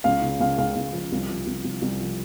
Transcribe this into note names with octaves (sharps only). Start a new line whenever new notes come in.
C#2 F5
C#3
C#2 F5
C#2 F5
C#2
F3
C2
F3
C2
C2
C2
F3